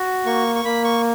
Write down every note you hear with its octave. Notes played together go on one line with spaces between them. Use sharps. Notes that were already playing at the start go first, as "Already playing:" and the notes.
Already playing: F#4
A#3 C#6
C#6
A#3 B5
C#6